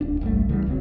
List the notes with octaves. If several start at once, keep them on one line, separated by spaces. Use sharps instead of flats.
D1 D4
G1 C2 G3 A3
C2 C#3 E3 G3
D#1 C#2 F#3 C4